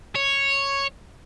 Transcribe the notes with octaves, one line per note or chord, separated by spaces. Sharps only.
C#5